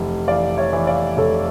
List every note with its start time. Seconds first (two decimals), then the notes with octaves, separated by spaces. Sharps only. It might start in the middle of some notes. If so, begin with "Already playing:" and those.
Already playing: F1 E3
0.28 E3 D5 F5
0.58 C#5 E5
0.73 E3
0.87 D5 F5
1.17 F1 A4 C#5